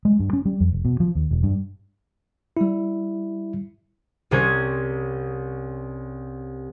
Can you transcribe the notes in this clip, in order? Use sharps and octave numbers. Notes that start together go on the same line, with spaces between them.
G#3
G2
C#4
G3
F2
F1
B2
F3
D#2
E1
G2
G3 E4
C2 C3 C#4 G#4 G#6